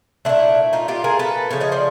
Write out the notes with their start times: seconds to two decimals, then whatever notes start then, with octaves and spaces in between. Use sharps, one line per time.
0.25 F3 A3 D4 E4
0.29 A#2
0.73 D#4 F4
0.88 F4 G4
1.04 G#4 A#4
1.19 A4 B4
1.51 C#3 F3 A3 C#5
1.61 C#5 D#5
1.72 C5 D5